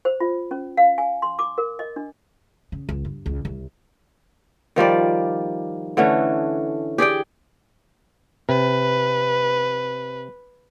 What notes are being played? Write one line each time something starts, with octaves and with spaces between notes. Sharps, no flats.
C5
F4
C#4
F5
G#5
C6
D6
A#4
D#5
D4
C#3
C#2
G2
C#2
C2
D#3 F3 G3 D5
D3 E3 A3 C#4
G4 G#4 D5 G5
C3 B4